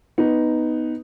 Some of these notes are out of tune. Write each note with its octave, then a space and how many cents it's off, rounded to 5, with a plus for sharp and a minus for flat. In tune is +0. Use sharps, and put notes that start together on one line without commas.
B3 +0 D#4 +0